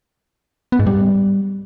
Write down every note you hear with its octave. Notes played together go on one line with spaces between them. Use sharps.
B3
G#2
G3